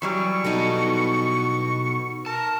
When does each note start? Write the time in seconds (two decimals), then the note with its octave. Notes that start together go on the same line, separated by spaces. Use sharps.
0.02 E3 F#3 G3 C#6
0.44 B2 B3 D#4 F#4 A4
2.26 A#4 A5